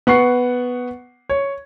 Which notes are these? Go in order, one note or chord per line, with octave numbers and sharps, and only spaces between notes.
B3 F#5 C#6 C7
C#5